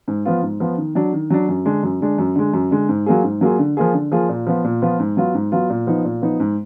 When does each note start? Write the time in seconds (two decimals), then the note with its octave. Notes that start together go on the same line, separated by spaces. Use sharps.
0.08 G#2
0.25 F3 B3 F4
0.42 G#2
0.60 F3 B3 F4
0.78 D#3
0.95 F#3 D4
1.13 D#3
1.30 F#3 D4
1.49 F#2
1.66 D3 G#3 D4
1.83 F#2
2.00 D3 G#3 D4
2.18 F#2
2.36 D3 G#3
2.54 F#2
2.71 D3 G#3
2.89 G#2
3.06 F#3 A#3 F4 G#4
3.24 G#2
3.41 F#3 A#3 F4 G#4
3.59 D3
3.77 F3 A#3 F4 G#4
3.94 D3
4.12 F3 A#3 F4 G#4
4.29 A#2
4.47 F3 B3 F4
4.64 A#2
4.82 F3 B3 F4
5.00 G#2
5.17 F#3 B3 F4
5.34 G#2
5.52 F#3 B3 F4
5.70 A#2
5.87 F3 B3 D#4
6.05 A#2
6.22 F3 B3 D#4
6.40 G#2